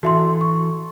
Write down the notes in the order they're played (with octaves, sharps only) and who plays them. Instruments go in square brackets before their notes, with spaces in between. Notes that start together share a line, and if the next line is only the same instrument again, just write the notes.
[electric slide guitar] E3 A4 [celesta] F#4 E5 C6
[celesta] C#6